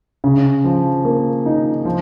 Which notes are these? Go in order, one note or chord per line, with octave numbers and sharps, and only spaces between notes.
C#3
F3
A#3
D#4
F3